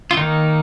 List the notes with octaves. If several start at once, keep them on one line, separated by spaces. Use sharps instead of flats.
F4
D#3 A#3 D#4